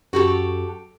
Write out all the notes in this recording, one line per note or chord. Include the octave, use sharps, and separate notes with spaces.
F#2 F#4 G4 A4